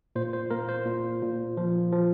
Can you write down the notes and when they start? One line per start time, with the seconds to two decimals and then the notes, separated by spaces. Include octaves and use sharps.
0.16 A#2 C5
0.33 C5
0.50 A#3 A#4
0.69 C5
0.86 A#2
1.22 A#2
1.57 F3
1.92 F3